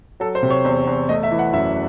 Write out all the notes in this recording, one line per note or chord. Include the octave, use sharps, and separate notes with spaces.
F#3 A4
C5
C3
C#5
E2 C5
E2
A3 D#5
E5
E3
F#5
F#2 E5